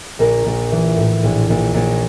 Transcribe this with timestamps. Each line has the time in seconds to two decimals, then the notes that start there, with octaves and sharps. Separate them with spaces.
0.19 A#1 A#4
0.46 A#1
0.72 E3
0.97 A2
1.23 A#1
1.49 A#1
1.74 A#1 C#5